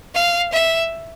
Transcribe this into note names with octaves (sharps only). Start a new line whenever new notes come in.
F5
E5